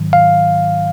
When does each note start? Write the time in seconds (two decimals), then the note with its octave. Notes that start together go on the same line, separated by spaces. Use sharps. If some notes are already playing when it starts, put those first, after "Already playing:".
Already playing: G#2 D#3 F#3
0.13 F5